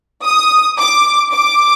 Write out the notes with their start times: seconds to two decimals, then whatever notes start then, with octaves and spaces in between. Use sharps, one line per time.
0.24 D#6
0.79 D6
1.33 D6